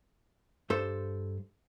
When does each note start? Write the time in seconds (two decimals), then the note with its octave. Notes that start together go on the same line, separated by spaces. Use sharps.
0.70 G2 A4 C5